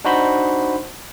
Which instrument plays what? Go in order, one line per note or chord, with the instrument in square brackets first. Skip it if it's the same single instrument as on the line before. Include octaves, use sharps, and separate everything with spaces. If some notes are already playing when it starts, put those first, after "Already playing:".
[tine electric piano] D4 D#4 F#4 C5 B5 C6